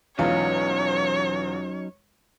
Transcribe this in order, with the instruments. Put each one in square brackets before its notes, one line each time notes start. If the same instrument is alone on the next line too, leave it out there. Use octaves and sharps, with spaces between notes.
[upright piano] E1 E2 F4 [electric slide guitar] F#3 C#4 D#4 [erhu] C#5